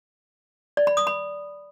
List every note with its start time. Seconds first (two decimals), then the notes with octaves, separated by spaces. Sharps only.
0.77 D5
0.87 B5
0.97 D#6
1.07 B5